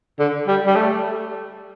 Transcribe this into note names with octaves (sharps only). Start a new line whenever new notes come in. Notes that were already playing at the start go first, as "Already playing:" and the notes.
D3
G3
G3
A3